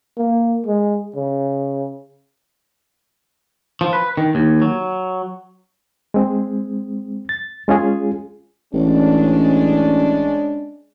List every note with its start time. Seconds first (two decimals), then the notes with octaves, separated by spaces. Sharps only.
0.18 A#3
0.67 G#3
1.16 C#3
3.81 F3
3.93 B4
4.17 D#3
4.35 D#2
4.62 F#3
6.14 G#3 C4
7.29 A6
7.68 G#3 C#4 F4 G#4
8.74 A1 G#3 C#4 D4